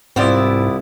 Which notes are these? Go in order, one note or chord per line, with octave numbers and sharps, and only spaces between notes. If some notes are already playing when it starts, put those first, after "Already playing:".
C2 G#2 B3 C4 E4 F4 D5